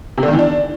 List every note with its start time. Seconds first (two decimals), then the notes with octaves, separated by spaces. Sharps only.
0.18 C3
0.23 D3
0.28 D#3
0.33 E3
0.39 D4